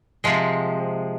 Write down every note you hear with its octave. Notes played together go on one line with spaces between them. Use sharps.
C3 F3 G#3